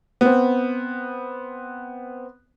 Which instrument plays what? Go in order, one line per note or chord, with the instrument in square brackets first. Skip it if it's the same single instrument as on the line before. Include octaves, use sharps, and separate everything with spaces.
[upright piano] B3 C4